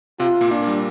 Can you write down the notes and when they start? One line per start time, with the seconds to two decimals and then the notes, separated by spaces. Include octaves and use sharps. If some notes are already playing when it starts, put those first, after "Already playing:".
0.19 C3 C4 F4
0.41 A#2 A#3
0.51 A#2 A#3 D4
0.62 A#3
0.67 G3